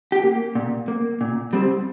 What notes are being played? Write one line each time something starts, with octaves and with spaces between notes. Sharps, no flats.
G4
A#3
A#2
A#3
A#2
G3 C4